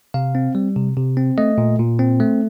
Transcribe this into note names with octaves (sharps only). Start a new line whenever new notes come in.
C3 F5
C4
G3
C3
C3
C4
A3 D#5
A#2
A#2
C4
A3